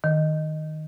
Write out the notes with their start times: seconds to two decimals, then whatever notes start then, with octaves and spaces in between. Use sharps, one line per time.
0.04 D#3